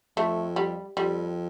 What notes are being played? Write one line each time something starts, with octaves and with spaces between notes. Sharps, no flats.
F2 A3
G3
F2 G3